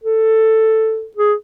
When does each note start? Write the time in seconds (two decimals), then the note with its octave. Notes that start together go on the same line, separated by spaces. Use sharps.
0.04 A4
1.17 G#4